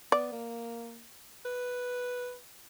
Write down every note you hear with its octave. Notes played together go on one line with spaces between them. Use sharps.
B3 D5
A#3
B4